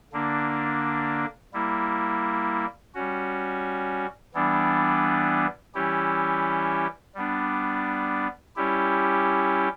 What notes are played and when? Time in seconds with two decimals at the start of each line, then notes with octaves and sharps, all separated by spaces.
0.13 D3 A#3 D4
1.53 G3 A#3 E4
2.94 G3 C#4 F#4
4.34 E3 G3 B3 D4
5.75 E3 G3 C#4 E4 G4
7.15 G3 B3 D4
8.56 G3 C#4 E4 G4